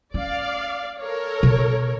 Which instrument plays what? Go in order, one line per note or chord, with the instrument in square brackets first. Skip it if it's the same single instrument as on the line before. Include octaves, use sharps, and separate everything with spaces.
[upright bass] C#4 [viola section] D5 F5
[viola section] A4 A#4 C#5
[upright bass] B2